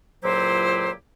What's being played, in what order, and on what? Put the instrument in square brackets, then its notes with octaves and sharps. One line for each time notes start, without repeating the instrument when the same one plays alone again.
[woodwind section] C#2 A#2 F#3 E4 G4 C5